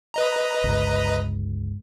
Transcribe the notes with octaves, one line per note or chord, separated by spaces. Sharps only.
B4 D#5 A#5
G1 C#2